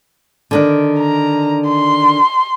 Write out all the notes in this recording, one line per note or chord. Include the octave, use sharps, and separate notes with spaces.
D3 D#3 D4
A#5
C6